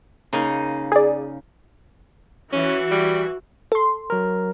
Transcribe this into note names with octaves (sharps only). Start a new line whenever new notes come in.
C#3 A#3 D#4
G#4 D5
E3 C#4 F#4
G3
A4 C6
F#3 A#4